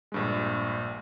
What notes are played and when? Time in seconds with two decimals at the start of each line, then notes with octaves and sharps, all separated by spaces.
0.12 A#1 G2 G#3